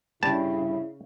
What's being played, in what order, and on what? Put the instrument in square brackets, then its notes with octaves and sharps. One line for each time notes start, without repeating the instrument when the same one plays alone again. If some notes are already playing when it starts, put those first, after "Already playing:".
[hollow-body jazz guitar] G2 [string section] C#3 [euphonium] E4 [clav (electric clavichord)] A5